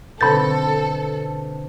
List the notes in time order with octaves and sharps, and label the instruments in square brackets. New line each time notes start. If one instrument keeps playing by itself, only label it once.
[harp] B2 D3 C4 [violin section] A4 [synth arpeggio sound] B5 A6 [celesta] G6